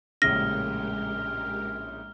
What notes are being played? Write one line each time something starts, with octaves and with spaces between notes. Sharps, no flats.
A#1 A2 C#3 G#3 G4 A#4 F6 A#6